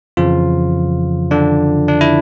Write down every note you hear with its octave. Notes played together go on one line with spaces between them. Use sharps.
F2 C#3 E3 F3 F4
D3 D4
D4
E4